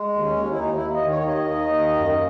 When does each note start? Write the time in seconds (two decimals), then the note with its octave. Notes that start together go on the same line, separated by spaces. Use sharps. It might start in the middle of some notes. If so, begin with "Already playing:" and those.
Already playing: G#3
0.14 D#2
0.25 C#4
0.36 D#2
0.51 E4
0.59 D#2 D#4
0.77 E4
0.82 D#2
0.94 D#5
1.04 D#3
1.11 C#5
1.27 D#2 D#5
1.51 D#3
1.72 D#2
1.96 F#2